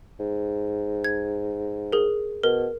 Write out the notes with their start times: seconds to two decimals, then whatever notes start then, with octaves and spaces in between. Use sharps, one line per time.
0.20 G#2
1.04 G#6
1.92 G#4 A#4
2.43 B2 A#4